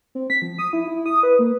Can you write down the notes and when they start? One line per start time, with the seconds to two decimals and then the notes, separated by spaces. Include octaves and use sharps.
0.15 C4
0.30 B6
0.42 F3
0.58 D#6
0.73 E4
0.87 E4
1.06 D#6
1.23 B4
1.39 A#3